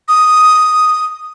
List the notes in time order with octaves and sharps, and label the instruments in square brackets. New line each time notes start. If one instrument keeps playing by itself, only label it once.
[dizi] D#6